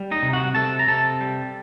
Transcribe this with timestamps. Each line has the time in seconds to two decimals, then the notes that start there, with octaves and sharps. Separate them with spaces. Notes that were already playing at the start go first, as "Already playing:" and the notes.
Already playing: G3
0.11 D#4 D#5
0.23 C3
0.33 F#4 F#5
0.55 C3 A4 A5
0.79 A#5
0.88 C3 A4 A5
1.20 G3